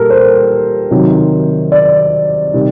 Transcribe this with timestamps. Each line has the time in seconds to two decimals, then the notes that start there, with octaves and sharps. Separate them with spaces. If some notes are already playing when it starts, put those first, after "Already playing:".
Already playing: A#2 G3 A#3 G4 A4 A#4
0.10 C5
0.91 C3 D#3 F#3
1.72 D5
2.53 C3 D#3 G3